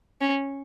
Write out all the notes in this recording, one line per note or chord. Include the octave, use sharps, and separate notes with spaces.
C#4